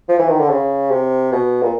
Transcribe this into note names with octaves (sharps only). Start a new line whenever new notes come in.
F3
E3
D#3
D3
C#3
C3
B2
A#2